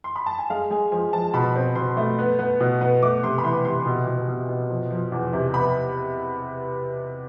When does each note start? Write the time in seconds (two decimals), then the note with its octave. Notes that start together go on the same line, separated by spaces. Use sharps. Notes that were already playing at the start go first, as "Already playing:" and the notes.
0.04 C6
0.16 B5
0.26 A5
0.39 G#5
0.50 G#3 F5
0.70 G#3 G#5
0.92 F3 G#5
1.13 F3 A5
1.34 B2 B5
1.55 C4
1.75 B2 C6
1.97 A3
2.19 B3
2.39 B3
2.60 B2
2.81 B3
3.02 A3 D6
3.24 C3 C6
3.38 B5
3.44 E3 C6
3.65 C3 C6
3.86 B2
4.07 B2
4.28 B2
4.49 B2
4.70 F3
4.91 F3
5.12 E2
5.33 C3
5.54 B3 B5